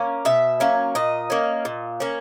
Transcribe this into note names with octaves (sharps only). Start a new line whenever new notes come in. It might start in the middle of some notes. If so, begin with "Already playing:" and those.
Already playing: A#3 C#4
B2 E5
F#3 A#3 C#4
A#2 D#5
A#3 C#4
A#2
A#3 C#4